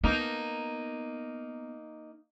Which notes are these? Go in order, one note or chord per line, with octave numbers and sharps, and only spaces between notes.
A#3 B3 D#4